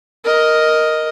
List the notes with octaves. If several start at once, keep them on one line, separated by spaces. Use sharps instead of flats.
A#4 D#5